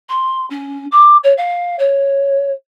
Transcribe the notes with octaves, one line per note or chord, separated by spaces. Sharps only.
C6
C#4
D6
C#5
F5
C#5